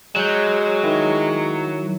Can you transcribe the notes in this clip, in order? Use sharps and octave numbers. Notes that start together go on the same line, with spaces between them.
F#3 G#3 F#6 G6
D#3 E4